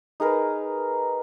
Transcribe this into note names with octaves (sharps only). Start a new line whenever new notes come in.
D#4 G#4 A#4 B4